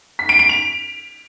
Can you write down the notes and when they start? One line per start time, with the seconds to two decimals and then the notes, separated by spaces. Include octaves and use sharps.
0.19 B6
0.29 D7
0.39 D7
0.49 F7